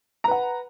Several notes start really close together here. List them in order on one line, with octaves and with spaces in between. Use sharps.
A#5 B4 F#5